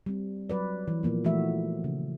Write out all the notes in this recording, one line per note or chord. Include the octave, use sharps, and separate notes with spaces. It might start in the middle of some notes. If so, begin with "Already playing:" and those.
G3 C4
F#3 B4 D5
E3
A#2 F3 A#3 B3
E3 F3 A3 F#4 E5
C#3